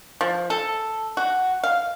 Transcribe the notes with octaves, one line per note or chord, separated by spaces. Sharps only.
F3
A4
F#4
F5